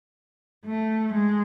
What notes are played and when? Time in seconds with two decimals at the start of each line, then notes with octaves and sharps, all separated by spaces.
0.65 A3
1.13 G#3